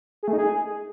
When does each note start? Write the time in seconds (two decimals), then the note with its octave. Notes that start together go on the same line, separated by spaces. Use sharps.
0.23 G#4
0.28 A3
0.33 D#4
0.38 G#4